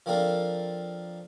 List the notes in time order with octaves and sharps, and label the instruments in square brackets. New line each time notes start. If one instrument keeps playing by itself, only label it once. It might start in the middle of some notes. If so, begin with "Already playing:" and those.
[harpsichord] F3 A#3 C4 D4 A4 A#4